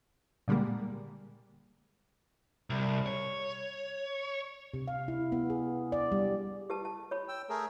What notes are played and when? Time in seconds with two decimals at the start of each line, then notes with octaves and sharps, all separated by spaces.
0.48 A#2 D3 G3 G#3 A#3
2.70 C2
3.06 C#5
4.74 C3
4.88 F5
5.08 E4
5.32 B3
5.50 G#4
5.92 D5
6.12 G3
6.70 G4 B4 A5
6.85 A5
7.11 C#5 B5
7.28 G5 E6
7.49 A3 G#4 A#4